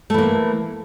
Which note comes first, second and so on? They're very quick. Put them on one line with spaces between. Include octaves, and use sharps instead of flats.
A3 E3 A#3